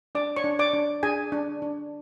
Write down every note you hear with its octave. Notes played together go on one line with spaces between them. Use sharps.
D4 D5 D6
C#5 C#6
D4
D5 D6
D4
D4 G#4 G#5
D4
D4